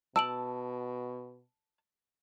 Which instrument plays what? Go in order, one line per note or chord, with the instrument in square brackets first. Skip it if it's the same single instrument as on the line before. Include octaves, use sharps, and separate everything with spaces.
[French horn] B2 [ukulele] A5 [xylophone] E6 D7 F#7